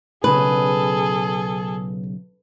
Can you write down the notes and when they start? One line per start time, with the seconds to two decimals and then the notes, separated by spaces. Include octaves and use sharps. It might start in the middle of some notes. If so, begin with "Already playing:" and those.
0.24 B1 A2 C#3 G#4 A4 B4